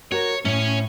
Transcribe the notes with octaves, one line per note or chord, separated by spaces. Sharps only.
F#4 A#4 C#5
A2 C#4 C#5